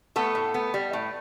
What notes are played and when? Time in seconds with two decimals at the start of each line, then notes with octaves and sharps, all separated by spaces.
0.16 A3 B3 A4
0.35 A2
0.54 B3
0.74 G3
0.93 A2